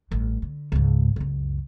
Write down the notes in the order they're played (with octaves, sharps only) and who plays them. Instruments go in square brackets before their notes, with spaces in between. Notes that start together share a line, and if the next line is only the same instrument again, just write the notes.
[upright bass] A1 G2
D3
C#2 G#2
C#2 F#2